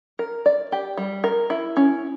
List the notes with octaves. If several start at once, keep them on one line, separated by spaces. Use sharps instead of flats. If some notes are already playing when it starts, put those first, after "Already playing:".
A#4
D5
G4
G3
A#4
E4
C#4